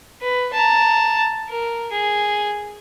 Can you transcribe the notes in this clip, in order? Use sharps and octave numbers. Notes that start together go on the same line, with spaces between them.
B4
A5 A#5
A#4
G#4